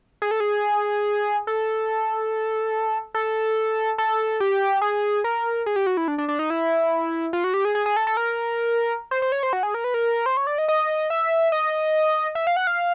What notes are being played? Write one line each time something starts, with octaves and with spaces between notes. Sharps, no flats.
G#4
A4
G#4
A4
A4
A4
G4
G#4
A#4
G#4
G4
F#4
E4
D4
D4
D4
D#4
E4
F4
F#4
G4
G#4
G#4
G#4
A4
A4
A#4
C5
C5
C#5
C5
F#4
G#4
A#4
B4
A#4
C5
C#5
D5
D#5
D#5
E5
D#5
E5
F5
F#5
F5